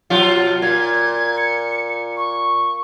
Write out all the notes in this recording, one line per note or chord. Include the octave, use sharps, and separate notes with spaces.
B2 F#3 F4
A#2 G#6
C#7
C#6